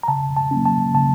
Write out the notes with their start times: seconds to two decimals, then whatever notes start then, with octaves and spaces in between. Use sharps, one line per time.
0.03 A#5
0.08 C#3 A5
0.36 A5
0.51 F#3 A#3 C#4
0.65 A5
0.94 C#3 A5